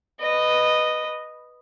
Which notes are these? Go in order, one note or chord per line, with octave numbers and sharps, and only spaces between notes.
B4 D#5